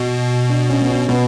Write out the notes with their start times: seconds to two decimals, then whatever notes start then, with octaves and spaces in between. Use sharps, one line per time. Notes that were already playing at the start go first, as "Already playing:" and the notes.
Already playing: B2
0.49 D4
0.69 C#4
0.81 B3
0.89 C#4
1.08 B2 B3